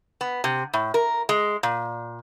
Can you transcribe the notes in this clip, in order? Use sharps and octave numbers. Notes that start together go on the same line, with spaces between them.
B3
C3
A2
A#4
G#3
A#2